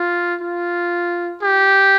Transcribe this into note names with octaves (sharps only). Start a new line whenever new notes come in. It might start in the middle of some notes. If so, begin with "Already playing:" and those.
Already playing: F4
F4
G4